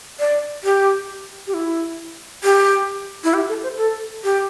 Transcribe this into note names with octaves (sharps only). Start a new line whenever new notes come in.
D5
G4
G4
E4
G4
E4
G4
A4
C5
A4
G4